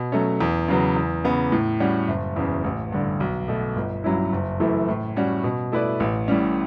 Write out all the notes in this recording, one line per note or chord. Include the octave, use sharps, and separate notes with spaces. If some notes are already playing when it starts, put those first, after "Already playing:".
Already playing: B2
F#3 A3 C#4
E2
C#3 F#3 B3
E2
C#3 E3 B3
A2
G3 C#4 F#4
F#1
E2 C#3
A1
G2 D3
B1
B2 A3
G1
G2 F#3 C#4 E4
F#1
F#2 E3 A3 E4
A2
G3 C#4 F#4
B2
A3 E4 B4 D5
A1
A2 G3 C#4